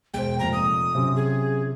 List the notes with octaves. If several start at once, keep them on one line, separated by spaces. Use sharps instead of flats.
E1 G#3 C5 G5
F1 A#2 A#5
D#6
C3 F#3 C#4 F4
G#4